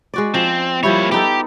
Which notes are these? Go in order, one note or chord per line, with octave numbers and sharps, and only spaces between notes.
G#3 F#4 D5
F3 C4
F3 G3 A#3 E4 C#5
B3 D#4 G4 A4